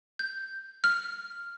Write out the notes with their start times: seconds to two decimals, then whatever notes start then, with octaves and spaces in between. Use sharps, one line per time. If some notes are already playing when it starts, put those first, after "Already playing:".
0.19 G6
0.84 F6